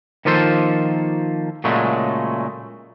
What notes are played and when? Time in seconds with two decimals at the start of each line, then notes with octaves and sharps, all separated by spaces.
0.25 D#3 F3 A#3 F4 A4 C5
1.64 A#2 C#3 F#3 G#3 A3